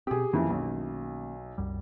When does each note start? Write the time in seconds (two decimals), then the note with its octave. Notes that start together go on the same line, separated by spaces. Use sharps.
0.07 B2 C4 G4 G#4
0.33 F2 D#3 E3 A#3 C#4
0.50 B1
1.58 C2 F#2 G3